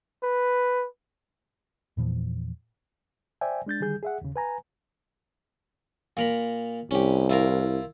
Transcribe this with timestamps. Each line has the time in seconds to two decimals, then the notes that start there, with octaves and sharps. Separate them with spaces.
0.23 B4
1.97 E2 A#2 E3 F3
3.41 C5 D5 E5 G5 G#5
3.66 G#3 D4 G6 A6
3.80 D3 D#3 G3 G#4 G6
4.03 G#4 E5 F#5
4.21 D#2 C#3
4.36 B4 G#5 A#5
6.17 A#2 A#4 B5
6.91 C2 C#4 G4
7.30 E4 F4 A#4